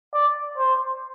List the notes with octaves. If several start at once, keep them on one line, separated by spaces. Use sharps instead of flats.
D5
C5